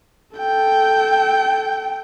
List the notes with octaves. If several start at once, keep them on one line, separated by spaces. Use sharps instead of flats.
A4 G5